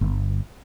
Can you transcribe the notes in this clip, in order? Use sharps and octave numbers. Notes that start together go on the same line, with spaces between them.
G1